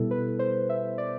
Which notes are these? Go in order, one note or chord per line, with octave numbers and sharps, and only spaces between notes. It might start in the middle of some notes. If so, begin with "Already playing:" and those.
Already playing: B2 G3 B3 E4 A4
B4
C5
E5
D5